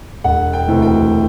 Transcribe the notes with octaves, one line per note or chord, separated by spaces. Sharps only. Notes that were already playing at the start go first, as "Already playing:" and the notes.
E1 F#5
G5
D2 C3 E3
G5